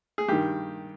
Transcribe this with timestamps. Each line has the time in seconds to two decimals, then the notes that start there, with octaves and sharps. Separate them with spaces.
0.18 G#4
0.28 G2 D#3 G4